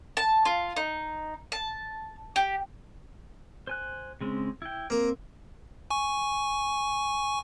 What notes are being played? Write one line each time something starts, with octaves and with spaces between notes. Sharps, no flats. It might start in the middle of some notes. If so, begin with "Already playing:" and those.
A5
F4
D#4
A5
G4
C5 G#5 F#6
C#3 G#3 C4
E4 G5
A#3 C4 A#4
G#5 C#6